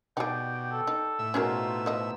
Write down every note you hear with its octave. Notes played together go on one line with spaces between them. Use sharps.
B2 D#4 G4 G#4 D5 G5
A4
D#4
A2 E5 E6
B2 C#4 D#4 F4 G#4 A#4 C5
F3 D#5